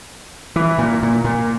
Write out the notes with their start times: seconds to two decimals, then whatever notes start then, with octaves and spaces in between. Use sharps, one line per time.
0.56 E3
0.78 A#2
1.03 A#2
1.24 A#2